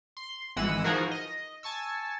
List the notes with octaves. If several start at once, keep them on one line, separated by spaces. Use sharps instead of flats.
C6
G#1 E3 G#3 F#5 E6 D#7
E3 F3 D#4 F#4 G#4 A#4
D#5
G#5 A5 C#6 E6